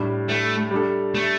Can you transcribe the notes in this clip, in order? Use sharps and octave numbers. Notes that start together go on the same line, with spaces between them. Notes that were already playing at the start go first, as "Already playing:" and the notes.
Already playing: A2 G3 D4
A3
G3 D4 A4
A3